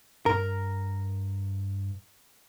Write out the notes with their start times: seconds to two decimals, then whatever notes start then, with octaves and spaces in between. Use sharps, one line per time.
0.26 G2 A#4